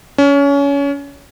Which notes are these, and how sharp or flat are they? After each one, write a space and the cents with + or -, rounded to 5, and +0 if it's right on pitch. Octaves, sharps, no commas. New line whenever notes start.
C#4 +25